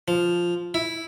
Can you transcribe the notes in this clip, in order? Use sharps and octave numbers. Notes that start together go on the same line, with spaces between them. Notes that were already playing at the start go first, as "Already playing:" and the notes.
F3
E4